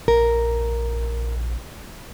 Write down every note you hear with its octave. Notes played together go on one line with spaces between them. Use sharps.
A#1 A#4